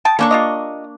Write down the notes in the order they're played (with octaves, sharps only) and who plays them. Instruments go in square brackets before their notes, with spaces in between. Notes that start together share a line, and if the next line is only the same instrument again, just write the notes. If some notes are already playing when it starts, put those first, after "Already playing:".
[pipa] D#5 G5 A5
[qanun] A#3 D4 C#6 [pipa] C#4 F#4 A4
[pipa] F4 G4 D#5